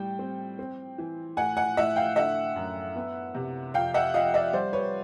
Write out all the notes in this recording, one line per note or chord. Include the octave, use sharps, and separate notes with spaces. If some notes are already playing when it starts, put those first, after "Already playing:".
Already playing: A2 G3 G5
C4
C4
E3
A2 F#5 G#5
F#5 G#5
A2 E5 F#5
F5 G5
D3 E5 F#5
F#2
B3
C3
F2 F5 G5
E5 F#5
F3 D#5 F5
D5 E5
G3 C5 D5
B4 C#5